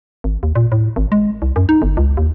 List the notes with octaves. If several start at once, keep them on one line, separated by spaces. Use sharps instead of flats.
G#1
D#2
A#2
A2
G#1
G#3
C2
F#2
D#4
G1
C#2
D#2